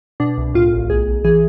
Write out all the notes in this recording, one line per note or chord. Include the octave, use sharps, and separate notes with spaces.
B2 D4
C2
A2 F4
A1
B1 G#4
B1
E3 G#4